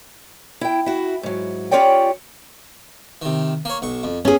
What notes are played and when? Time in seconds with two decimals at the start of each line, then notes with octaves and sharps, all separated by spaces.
0.61 E4 G5
0.86 E4 F#4
1.23 G#2 F#3
1.71 C#4 F4 G4 C#5 D5 G5
3.22 C3 D#3
3.65 A#3 C#5
3.82 B1 C#6
4.03 F2
4.25 E2 C#4 G#4